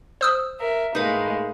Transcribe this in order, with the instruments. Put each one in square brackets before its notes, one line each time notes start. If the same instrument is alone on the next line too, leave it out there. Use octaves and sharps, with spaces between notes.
[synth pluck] C5 D#6 E6
[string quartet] A#4 E5
[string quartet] A2 G#3 A#3 [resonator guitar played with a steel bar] D#4 B4